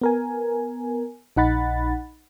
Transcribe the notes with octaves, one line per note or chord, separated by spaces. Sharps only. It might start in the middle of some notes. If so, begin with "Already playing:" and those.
B3 A#4 G#5
A#1 D#4 F#5 B5 A6